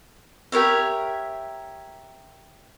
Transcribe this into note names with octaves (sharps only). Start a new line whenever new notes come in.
G4 A#4 C#5 E5